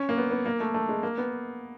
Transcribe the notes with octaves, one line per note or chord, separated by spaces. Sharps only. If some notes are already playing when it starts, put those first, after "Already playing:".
Already playing: C#4
A#3
B3
B3
A#3
A3
A3
G#3
A#3
B3